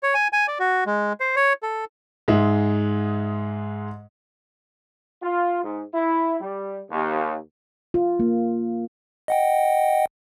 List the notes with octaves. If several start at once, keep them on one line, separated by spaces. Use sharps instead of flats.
C#5
G#5
G#5
D5
F#4
G#3
C5
C#5
A4
G#2 G#3 E5
F4
G#2
E4
G3
D#2
F4
A#3
D#5 F#5 G5